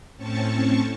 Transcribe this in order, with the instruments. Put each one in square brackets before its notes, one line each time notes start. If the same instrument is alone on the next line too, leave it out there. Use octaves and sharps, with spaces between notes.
[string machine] A2 C4 C#4 A5 C#6